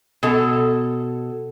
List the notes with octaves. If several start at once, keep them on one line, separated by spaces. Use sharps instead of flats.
B2 A4